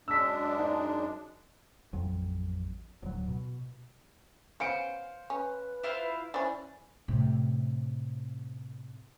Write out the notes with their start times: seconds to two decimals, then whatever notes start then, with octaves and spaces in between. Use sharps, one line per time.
0.08 F#2 G#3 D4 E6 B6
0.59 D#4
1.93 A1 F2 F#3
3.02 D1 F#3
3.28 B2
4.60 B3 C#4 C5 F5 C#7 D7
5.30 C#4 B4
5.83 E4 F4 C5
6.34 E3 C#4 D4 C5
7.08 A2 C3